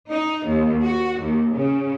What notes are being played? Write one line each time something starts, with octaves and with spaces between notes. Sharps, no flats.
D#4
D#2
F#4
D#2
C#3